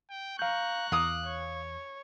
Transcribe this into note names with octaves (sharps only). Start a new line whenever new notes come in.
G5
F5 A#5 C#6 F#6 G6
E2 F5 D6 D#6
C#5